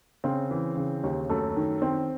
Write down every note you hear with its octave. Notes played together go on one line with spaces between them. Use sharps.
C#3 C4
E3
C#3
D#2
F#2 A3
D#3
D#3 C4